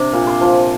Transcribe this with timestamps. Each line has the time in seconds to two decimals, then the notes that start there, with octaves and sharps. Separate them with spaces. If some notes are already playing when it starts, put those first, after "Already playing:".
Already playing: C3 D4 D6
0.13 A#2
0.27 C6
0.41 F3